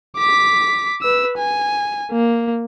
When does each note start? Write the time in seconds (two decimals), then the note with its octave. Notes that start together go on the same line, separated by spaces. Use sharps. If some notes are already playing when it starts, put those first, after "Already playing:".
0.17 D6 B6
1.02 B4 E6
1.38 G#5
2.12 A#3